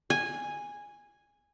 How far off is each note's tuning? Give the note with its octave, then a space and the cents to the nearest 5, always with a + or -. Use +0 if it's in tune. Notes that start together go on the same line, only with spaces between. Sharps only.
G#5 -10